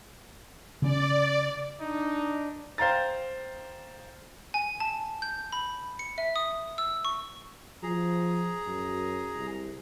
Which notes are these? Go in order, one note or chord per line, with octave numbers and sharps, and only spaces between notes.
C#3 C4 C#4 D5
D4 D#4
C5 F5 G5 A#5 A6
G#5
A5
G6
B5
C#7
E5
D#6
E6
C#6
F3 G#4 A#5
F#2
C2